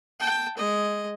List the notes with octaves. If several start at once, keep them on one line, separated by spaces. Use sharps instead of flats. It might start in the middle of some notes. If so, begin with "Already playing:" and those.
G5 A5
G#3 D#5